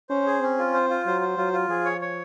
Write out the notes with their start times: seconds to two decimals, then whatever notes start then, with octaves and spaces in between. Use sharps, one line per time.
0.09 C#4 C5
0.26 G#4
0.42 C4 C#4
0.58 F4
0.74 C5
0.90 F4
1.06 F#3 C5
1.21 C5
1.37 F#3 F4
1.53 F4
1.69 F3 G#4
1.85 C#5
2.01 C#5